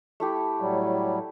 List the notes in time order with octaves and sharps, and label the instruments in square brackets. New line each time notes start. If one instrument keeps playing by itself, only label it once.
[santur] A3 E4 G4
[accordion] A2 F#3 G3